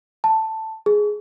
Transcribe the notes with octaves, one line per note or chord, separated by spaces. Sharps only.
A5
G#4